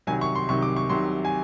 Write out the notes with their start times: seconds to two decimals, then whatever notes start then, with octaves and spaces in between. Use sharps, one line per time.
0.07 C2 C3 D#3 F#3 G#5
0.21 C#6
0.35 C6
0.49 C2 C3 D#3 F#3 C#6
0.62 D6
0.77 C#6
0.89 C2 C3 D#3 F#3 C6
1.25 G#5